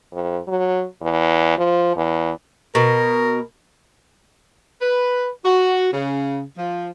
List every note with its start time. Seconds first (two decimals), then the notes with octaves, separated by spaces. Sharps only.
0.12 F2
0.48 F#3
1.01 E2
1.58 F3
1.96 E2
2.75 B2 A#4
4.81 B4
5.45 F#4
5.93 C#3
6.58 F3